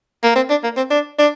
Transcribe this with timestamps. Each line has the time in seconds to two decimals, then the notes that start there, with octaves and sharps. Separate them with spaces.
0.23 A#3
0.36 C4
0.50 D4
0.64 A#3
0.77 C4
0.91 D4
1.19 D4